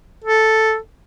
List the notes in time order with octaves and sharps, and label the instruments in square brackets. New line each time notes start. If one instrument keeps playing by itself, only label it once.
[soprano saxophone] A4